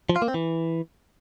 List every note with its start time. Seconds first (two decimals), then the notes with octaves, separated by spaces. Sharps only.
0.09 F3
0.16 F4
0.22 A#3
0.28 C4
0.34 E3